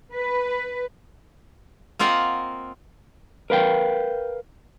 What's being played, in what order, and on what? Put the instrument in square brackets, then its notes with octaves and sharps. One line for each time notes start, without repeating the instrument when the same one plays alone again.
[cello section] B4
[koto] A#3 C4 F4 A#4 D#5 F#5
[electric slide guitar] A#4 B4 F5 G5